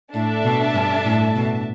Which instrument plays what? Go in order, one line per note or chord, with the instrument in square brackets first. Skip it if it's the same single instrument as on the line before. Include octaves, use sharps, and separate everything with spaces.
[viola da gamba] A2 [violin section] D4 A4 E5 A5
[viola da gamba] B2
G2
A2
B2